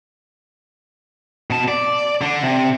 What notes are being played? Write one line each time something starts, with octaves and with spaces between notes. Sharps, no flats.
B2 A5
D5
D3 D4
C3